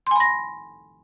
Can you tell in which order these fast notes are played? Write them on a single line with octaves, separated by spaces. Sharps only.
C6 G#5 B5 A#6